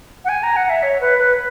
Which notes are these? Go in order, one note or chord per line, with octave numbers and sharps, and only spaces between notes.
F#5
G#5
A#5
F#5
E5
C#5
B4
B4